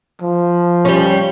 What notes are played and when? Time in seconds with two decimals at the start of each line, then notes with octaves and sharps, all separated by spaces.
0.22 F3
0.85 G3 C#4